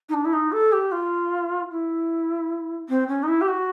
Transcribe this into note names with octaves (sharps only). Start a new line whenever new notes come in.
D#4
D4
E4
D#4
A4
G4
F4
E4
C4
C#4
D#4
E4
G4
F#4